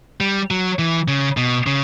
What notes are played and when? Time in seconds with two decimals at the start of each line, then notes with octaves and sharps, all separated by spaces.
0.20 G3
0.51 F#3
0.79 E3
1.08 C#3
1.37 B2
1.67 C#3